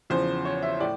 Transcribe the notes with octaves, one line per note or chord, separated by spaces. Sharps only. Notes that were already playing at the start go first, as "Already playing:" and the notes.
E2 C#3 F3 C5
C#5
E5
A2 D5